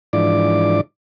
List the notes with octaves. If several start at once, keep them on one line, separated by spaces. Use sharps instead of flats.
G#2 E3 F3 D4 D5 D6